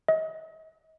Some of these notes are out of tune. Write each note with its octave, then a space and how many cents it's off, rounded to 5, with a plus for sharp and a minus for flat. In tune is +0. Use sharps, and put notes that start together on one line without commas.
D#5 +40